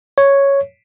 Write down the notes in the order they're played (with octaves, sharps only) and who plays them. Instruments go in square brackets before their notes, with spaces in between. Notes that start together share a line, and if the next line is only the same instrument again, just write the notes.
[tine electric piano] C#5